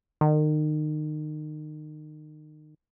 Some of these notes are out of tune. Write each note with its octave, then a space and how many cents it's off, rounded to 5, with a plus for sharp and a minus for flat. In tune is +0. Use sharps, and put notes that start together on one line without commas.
D#3 -30